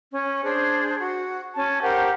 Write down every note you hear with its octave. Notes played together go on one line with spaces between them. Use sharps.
C#4
D4 G#4 C5
F#4
C#4 A5
G4 A#4 C5 F#5